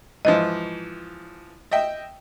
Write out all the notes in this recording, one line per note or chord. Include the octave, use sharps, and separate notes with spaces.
G#2 E3 F3 D#5
D#5 E5 G5